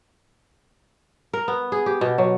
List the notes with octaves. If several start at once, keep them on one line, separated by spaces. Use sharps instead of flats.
A#4
B3
G#4
G4
B2
F#3